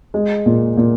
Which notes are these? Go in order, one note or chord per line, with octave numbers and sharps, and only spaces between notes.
G#3
A#2
A#2